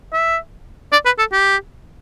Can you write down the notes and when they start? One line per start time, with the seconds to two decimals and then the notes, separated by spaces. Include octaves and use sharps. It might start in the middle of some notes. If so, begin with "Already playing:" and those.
0.13 E5
0.92 D5
1.06 B4
1.19 A4
1.32 G4